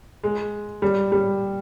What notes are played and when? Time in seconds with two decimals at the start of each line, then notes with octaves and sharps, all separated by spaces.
0.24 G#3
0.82 G3
1.12 G3